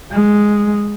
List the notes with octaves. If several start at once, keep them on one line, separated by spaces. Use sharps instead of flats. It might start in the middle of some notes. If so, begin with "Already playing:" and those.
G#3